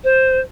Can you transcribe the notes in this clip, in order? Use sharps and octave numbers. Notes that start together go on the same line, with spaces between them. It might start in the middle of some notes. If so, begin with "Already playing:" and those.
C5